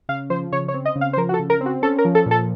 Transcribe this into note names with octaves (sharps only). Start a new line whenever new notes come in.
C#3 F5
F3 C5
C#3 C#5
C#5
C4
D#5
C#3
F5
C5
F3 A#4
F#4
A4
C#3
A#4
C4
F#4
C#4 A4
A#4
F3
A4
A#2
A4